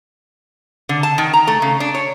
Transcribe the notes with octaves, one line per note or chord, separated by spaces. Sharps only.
D3
A5
D#3
A#5
A3
C#3
D4
C#5